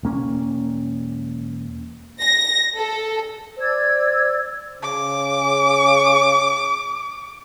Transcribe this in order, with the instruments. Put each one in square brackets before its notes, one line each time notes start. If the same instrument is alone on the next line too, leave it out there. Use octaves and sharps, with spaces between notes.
[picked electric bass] E1 A#3 C#4
[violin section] A#6
A4
[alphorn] C5 [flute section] D5 E6 G#6
[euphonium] C#3 [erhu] D6